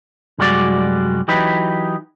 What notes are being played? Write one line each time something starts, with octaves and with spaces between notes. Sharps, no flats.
C2 F#2 G3 G#3 F#4 D5
E3 F#3 D#4 G4 B4